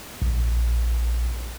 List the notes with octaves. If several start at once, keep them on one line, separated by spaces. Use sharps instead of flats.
A#1